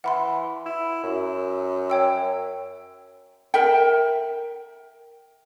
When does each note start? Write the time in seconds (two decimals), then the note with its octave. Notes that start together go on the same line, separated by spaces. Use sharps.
0.04 E3 F#5 B5 C6
0.66 E4
1.03 F#2
1.90 C#5 G5 E6
3.54 A#4 E5 G5